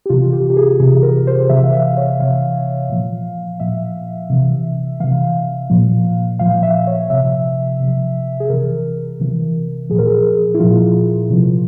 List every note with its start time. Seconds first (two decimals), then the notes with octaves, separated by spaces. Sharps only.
0.06 G4
0.09 C3 E3 F4
0.33 G4
0.50 G4
0.57 G#4
0.80 C3 E3 G#4
1.03 A#4
1.27 C5
1.49 C3 E3 E5
1.64 F5
1.73 E5
1.97 C#5
2.20 C3 E3 F5
2.90 A#2 F3
3.60 A#2 F3 E5
4.30 C3 E3
5.00 C3 E3 F5
5.70 A#2 F3
6.39 A#2 F3 F5
6.63 E5
6.87 C#5
7.10 C3 F3 E5
7.80 C3 F3
8.40 G#4
8.50 C3 E3 A#4
9.19 C3 E3
9.90 A#2 F3 G#4
9.99 A#4
10.07 G#4
10.54 E4
10.60 A#2 F3 F4
11.30 C3 F3